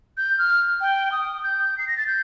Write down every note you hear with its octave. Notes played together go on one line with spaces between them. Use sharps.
G6
F6
G5
D#6
G6
C7
A#6
A6
G6